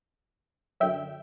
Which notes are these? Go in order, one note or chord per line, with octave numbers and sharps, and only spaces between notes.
F#2 D3 F#3 E5 G5